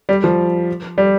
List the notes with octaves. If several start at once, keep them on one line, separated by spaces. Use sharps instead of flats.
G3
F3
G3